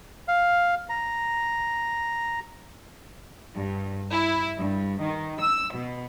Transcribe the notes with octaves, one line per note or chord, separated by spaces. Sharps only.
F5
A#5
G2
E4
G2
D#3
E6
B2